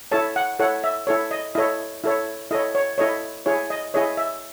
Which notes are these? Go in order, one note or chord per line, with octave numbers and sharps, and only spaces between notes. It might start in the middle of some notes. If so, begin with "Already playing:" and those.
E4 A4 C#5 A5
F#5
E4 A4 C#5 F#5
E5
E4 A4 C#5
D#5
E4 A4 C#5 D#5
E4 A4 C#5
E4 A4 C#5 D#5
C#5
E4 A4 C#5 D#5
E4 G#4 C#5
D#5
E4 G#4 C#5 D#5
E5